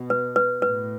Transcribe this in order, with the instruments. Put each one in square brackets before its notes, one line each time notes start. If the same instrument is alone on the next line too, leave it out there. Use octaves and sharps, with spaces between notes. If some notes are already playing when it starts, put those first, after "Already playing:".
Already playing: [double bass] B2
[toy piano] B4
B4
[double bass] A2 [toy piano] B4